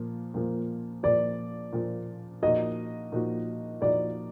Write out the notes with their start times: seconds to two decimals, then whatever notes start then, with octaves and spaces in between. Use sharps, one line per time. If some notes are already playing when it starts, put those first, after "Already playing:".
Already playing: A#2 F3 A#3
0.34 A#2 F3 A#3
1.03 A#2 F3 A#3 D5
1.73 A#2 F3 A#3
2.42 A#2 F3 A#3 D#4 F#4 D#5
3.12 A#2 F3 A#3 D#4 F#4
3.81 A#2 F3 A#3 D#4 F#4 D5